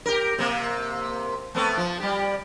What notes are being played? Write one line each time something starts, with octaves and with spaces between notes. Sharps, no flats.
G4 A#4
C3 A#3
A3 B3 C4
F3
G3 G4